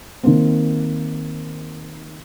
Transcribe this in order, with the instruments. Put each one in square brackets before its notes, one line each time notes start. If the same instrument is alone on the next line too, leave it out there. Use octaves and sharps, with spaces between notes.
[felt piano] D#3 A#3 C4